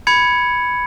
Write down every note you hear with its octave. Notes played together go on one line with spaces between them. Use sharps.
B5 G#6 C#7